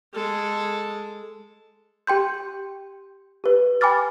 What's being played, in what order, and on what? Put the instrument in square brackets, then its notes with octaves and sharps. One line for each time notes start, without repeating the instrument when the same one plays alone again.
[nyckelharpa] G#3 A4
[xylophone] G4 G5 C6 G6
G4 B4
G5 G#5 B5 D6 F6 A6